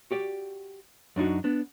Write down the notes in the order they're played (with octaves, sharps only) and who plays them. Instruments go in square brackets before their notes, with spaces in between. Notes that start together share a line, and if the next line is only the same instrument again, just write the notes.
[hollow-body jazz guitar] F#4 G4 D5
F#2 D4 D#4 F#4
B3 D4